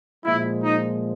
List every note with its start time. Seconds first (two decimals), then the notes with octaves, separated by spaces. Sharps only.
0.24 A#2 F3 G#3 E4
0.64 D#4